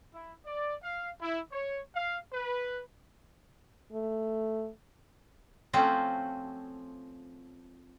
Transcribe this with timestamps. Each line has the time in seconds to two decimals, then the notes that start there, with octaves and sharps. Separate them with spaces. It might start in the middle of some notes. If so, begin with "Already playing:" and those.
0.14 E4
0.46 D5
0.83 F5
1.21 E4
1.52 C#5
1.95 F5
2.33 B4
3.93 A3
5.73 F3 A3 C4 C#4 F4 F#4